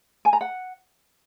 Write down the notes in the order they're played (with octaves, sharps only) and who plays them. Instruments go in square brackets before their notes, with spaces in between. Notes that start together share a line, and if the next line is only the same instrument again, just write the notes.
[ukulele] G#5
A#5
F#5